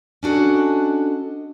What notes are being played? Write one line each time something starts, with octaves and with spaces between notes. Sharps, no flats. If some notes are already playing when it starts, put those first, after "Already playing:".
C#4 D4 F#4 A4 D#5